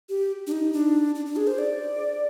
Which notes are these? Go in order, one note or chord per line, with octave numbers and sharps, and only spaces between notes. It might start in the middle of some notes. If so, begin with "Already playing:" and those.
G4
D4
D#4
D4
D4
D4
G#4
C5
D5